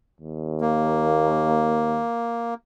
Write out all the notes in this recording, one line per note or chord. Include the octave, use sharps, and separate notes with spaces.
D#2
A#3